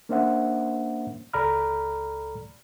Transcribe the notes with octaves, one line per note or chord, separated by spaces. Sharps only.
A#3 C#4 D4 C5 E5 F#5
C#2 A4 D5 A#5 B5 F6